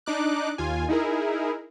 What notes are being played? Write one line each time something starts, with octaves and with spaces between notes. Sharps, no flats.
D4 D#4 D6 F#6
D#2 F4 G#5
D#4 E4 G#4 A#4